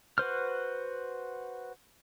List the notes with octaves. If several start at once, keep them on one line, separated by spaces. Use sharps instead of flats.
F#4 B4 C5 F6